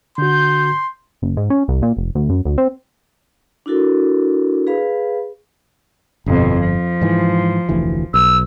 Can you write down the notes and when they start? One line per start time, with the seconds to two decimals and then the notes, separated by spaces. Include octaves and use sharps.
0.18 D3 F#4 C6 G6
1.22 F#1
1.37 G#2
1.50 C#4
1.68 C2
1.82 A#2
1.97 F1
2.15 D2
2.30 F#2
2.45 D2
2.58 C4
3.66 D4 E4 F#4 A4 A#4
4.67 G#4 B4 F5 B5
6.26 G1 F2 B2
6.59 F3
7.01 G#2 E3
7.69 F1 D2 E3
8.14 B1 E6